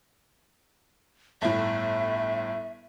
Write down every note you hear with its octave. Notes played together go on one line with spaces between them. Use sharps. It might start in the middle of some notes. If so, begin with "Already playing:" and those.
G1 A2 E5